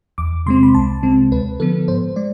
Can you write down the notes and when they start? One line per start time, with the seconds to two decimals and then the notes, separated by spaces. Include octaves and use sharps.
0.18 E2 D6
0.46 C3 G#3 C4 C6
0.63 B5
0.74 C2 A5
1.03 C3 G#3 C4
1.31 D2 B4
1.60 D3 F3 B3 A4
1.88 G#2 C5
2.16 G#3 D5